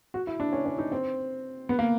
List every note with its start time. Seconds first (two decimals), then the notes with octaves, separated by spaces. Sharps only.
0.14 F#4
0.27 E4
0.40 D4
0.53 C#4
0.66 C#4
0.78 D#4
0.92 C4
1.69 B3
1.79 A#3